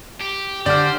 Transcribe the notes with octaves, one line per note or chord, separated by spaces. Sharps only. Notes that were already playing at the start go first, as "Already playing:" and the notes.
G4
D3 G4 C5 D5 F6